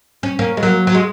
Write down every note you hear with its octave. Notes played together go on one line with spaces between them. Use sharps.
C#4
A#3 C#4
G#3
F#3 A#3
F#3
G#3